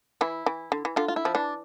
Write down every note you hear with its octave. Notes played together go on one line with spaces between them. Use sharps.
E3 E4
E3
D3
E3
D3 F4
F4
E4
F3
E3 D4